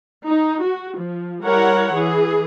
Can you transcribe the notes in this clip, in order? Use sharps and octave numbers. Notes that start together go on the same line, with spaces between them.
D#4
F#4
F3
G3 E4 A#4 C#5 F#5
E3 G#4